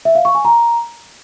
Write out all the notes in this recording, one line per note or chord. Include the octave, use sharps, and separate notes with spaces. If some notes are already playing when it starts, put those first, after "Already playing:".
E5
F5
C#6
G#5
A#5